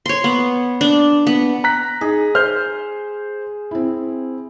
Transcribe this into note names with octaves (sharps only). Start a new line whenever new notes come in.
C#5 C6
B3
D4
B3
A#5 F#6 B6
D#4 G#4
C5 F6 G6
C4 E4